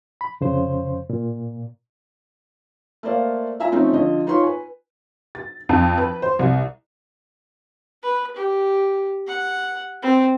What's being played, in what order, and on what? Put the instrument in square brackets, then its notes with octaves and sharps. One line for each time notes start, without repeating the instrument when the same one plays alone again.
[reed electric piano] B5
F2 C#3 C5
A#2
[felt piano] A3 A#3 C5 D5 F5
E4 F4 E5 G#5 A#5
F3 A3 C4 C#4 D#4
D3 F3 D#5
D#4 F4 B4 C#5 C6 C#6
B4 G#5
[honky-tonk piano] A6
F2
B4
C5
C2
[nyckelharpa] B4
G4
F#5
C4